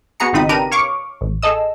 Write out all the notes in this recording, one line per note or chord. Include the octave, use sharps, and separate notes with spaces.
B3 F#4 G#4 A#5 C#7
G#1 C#3 C4 D#4 B5 D#6
D4 G4 A#4 B4 A#5 D#7
C#5 F5 C#6 D6
A1
G#4 A4 D#5 E6